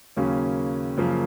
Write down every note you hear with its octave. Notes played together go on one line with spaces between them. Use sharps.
D#2 C#3 F#3 A#3 C#4
F#2 C#3 F3 A#3